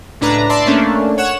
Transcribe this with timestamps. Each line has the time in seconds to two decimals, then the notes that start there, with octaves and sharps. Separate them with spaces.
0.21 C#2 A2 D4 B4 A#5
0.49 D5 E5 A5 C6
0.66 A3 A#3 C#4 D4
1.18 C#5 F#5 E7